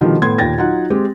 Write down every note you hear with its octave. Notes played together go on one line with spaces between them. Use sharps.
B2 D3 D#3 F3 G3
A2 B3 C6 G#6
D#2 A#2 G5 A6 A#6
F#3 D#4 F4 F#5
G#3 C4 G4